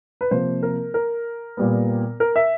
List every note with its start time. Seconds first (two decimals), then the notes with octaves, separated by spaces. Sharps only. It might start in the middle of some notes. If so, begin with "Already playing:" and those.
0.21 B4
0.31 C3 F3 A#3 C5
0.63 A#4
0.94 A#4
1.57 A#2 G3 B3
2.20 A#4
2.36 E5